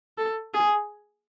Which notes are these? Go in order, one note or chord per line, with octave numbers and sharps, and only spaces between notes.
A4
G#4